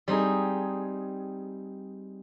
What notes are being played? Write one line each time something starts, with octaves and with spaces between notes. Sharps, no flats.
G3 C4 D#4 G#4